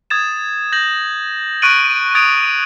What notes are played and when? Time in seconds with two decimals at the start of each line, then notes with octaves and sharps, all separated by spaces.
0.10 D#6 G#6 A6 E7
0.72 G6 A#6 F#7
1.62 C#6 F#6 A6 D7 D#7 F#7
2.15 D#6 G#6 A6 D7 F7